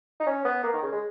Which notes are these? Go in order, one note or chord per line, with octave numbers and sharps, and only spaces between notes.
D#4
C#4
B3
A#3
D#3
C#3
G#3